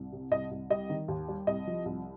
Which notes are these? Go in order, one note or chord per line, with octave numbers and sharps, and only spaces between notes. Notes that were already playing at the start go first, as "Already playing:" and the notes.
Already playing: C2
C3
C2 D#5
C2
G3 D#5
D#3
D#2
G3
C2 D#5
F3
C2